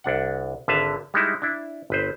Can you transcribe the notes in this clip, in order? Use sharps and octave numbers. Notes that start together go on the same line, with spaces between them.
C2 D4 F#5
G#1 D3 B4 E5 F5 A5
G3 G#3 D#4 E4
D4 E4
G1 B4 C5